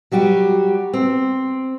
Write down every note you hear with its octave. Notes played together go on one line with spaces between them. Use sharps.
F#3 G3 F#4 G4
C4